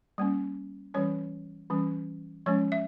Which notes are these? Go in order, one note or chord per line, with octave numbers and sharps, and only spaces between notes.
G3 A#3 C#4
E3 G3 C#4 C#5
E3 G3 C#4
F3 G#3 C#4 C#5
E5